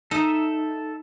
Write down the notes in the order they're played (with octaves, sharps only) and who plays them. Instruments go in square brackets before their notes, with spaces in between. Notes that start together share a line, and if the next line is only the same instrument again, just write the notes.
[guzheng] D#4 [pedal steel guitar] A4 E5